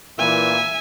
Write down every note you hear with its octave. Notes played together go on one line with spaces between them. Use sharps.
A#2 E3 E5 G#5